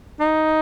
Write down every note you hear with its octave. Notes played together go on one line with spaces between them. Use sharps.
D#4